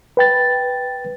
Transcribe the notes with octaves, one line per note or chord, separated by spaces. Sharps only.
B4 G5 A6